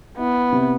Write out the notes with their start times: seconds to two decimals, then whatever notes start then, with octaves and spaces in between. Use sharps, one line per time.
0.18 B3 E4
0.52 C3